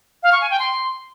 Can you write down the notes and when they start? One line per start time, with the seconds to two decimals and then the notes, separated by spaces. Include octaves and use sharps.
0.23 F5
0.32 C#6
0.41 G#5
0.50 G5
0.59 C6